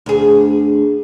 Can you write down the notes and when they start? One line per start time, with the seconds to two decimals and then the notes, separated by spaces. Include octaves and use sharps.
0.06 D2 G#4